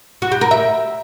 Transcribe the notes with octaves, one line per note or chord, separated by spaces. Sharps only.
F#4
G4
A#4
E5